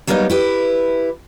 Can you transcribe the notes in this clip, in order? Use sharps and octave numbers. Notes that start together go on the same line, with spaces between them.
F#3 G3 A#3 B3 D4 D#4
E4 G4 B4